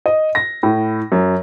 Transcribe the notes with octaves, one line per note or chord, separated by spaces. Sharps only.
D#5
A#6
A2
F#2